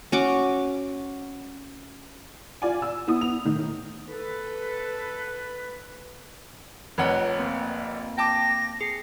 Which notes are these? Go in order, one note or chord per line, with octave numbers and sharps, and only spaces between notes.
C#4 F#4 D6
F4 D5 G#5
E6
B3 E4 D#6
B3 F7
A2 D#3
A4 B4
F1 F2 B4 C#5 F#5 A#5
A#3 C4
G5 A5 D6 A#6
G#4 C7